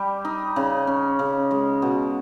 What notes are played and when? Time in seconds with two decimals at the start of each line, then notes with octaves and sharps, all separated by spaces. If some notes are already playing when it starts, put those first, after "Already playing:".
Already playing: G3 G4
0.25 D#4
0.56 C#3
0.87 C#4
1.19 C#3
1.51 G#3
1.82 B2